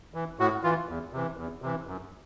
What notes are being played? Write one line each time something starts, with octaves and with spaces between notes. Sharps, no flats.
E3
A2 F#4
E3 F4
E2
C3 E3
E2
C3 E3
F#2